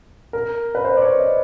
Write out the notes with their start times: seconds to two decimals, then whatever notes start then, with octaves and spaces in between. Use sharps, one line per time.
0.33 A#4
0.75 B4
0.85 C5
0.97 D5
1.02 C#5
1.19 D#5